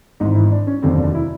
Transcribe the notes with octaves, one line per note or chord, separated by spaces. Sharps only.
G#1 G#2 E3 D#4
E4
D4
C#4
F1 D#2 D3 F#3 C4
D4
E4